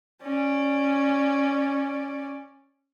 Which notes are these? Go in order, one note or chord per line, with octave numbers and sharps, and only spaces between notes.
C#4 D5